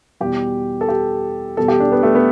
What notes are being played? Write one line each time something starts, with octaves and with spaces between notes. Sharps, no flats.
E2 B2 G3 G4
A4
G4
E2 B2 G3 A4
G4
D4
B3
A3
B3